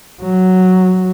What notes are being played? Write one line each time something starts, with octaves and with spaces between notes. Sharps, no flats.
F#3